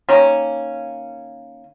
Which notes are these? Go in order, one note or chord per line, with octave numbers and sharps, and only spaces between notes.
D#3 A#3 C#4